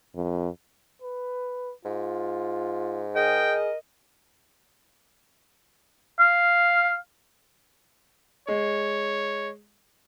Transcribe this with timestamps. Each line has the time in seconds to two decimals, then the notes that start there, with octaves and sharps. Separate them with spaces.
0.15 F2
1.02 B4
1.85 G#2 F4
3.15 G#4 A#4 D#5 G5
6.20 F5
8.48 G#3 C#5